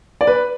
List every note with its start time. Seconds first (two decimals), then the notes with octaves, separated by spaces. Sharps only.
0.21 D5
0.27 B4